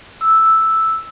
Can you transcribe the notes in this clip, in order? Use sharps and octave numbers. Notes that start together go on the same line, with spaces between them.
E6